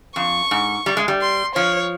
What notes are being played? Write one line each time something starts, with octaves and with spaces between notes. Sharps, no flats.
F2 C#6
G#2
G3
G#3
G3
C6
F3 C#5